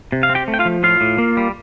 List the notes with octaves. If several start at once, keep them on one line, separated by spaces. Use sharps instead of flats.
C3
F5
C4
G4 G5
A3
G5
F4 F5
F3
A2 F4 F5
A2
A#3
G3